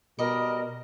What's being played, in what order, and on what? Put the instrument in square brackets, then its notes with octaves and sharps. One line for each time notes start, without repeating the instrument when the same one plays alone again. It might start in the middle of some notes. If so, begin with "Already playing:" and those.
[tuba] B2 [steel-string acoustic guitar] G3 D#5 [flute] A#4